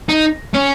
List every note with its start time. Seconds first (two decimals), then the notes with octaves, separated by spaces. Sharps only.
0.09 D#4
0.54 C#4